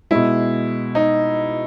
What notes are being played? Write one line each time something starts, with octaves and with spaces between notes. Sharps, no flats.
B2 G#3 E4
D#4